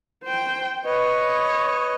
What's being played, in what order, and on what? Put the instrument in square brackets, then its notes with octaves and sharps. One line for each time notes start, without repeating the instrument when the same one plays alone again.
[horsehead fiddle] C5 G5
[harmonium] B4 D#5 [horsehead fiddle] C#5